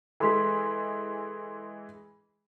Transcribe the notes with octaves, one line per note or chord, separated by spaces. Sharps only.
E3 G#3 A4 C6 B6